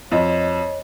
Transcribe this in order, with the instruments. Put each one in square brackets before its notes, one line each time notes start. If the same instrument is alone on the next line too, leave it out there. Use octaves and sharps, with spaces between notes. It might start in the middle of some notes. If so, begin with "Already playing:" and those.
[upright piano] F2 [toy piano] F#4 D#5 [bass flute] C#5